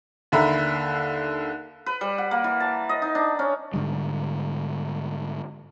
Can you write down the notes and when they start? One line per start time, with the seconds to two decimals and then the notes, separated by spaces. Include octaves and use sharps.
0.32 D#2 D3 E5 A#5 B5
1.86 B4
2.01 G3
2.18 F#5
2.31 A#3
2.44 E3
2.60 A5
2.89 D#5
3.02 D#4
3.15 D4
3.39 C#4
3.74 G#2 D3 G3